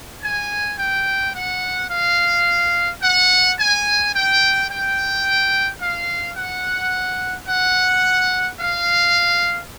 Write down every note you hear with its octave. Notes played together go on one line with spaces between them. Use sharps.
G#5
G5
F#5
F5
F#5
G#5
G5
G5
F5
F#5
F#5
F5